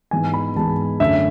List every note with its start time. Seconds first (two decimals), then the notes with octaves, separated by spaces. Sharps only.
0.11 G#2 E3 G#3 B3 G#5
0.34 B5
0.56 G#2 E3 G#3 B3 A5
1.00 F#2 D3 A3 C#4 E5